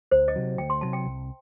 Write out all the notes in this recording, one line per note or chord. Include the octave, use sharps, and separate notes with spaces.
D2 C5
D#5
C3 F#3
D2 G5
C6
C3 F#3 A5
G5
C2